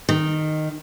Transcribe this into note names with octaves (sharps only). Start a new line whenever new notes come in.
D#3